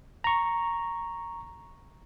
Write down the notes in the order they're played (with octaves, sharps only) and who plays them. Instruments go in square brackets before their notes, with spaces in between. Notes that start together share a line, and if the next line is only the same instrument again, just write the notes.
[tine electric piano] A#5 C#6